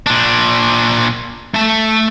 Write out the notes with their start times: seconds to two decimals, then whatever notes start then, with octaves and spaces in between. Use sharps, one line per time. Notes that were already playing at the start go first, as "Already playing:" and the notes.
0.07 A#2 D4
1.54 A3 A5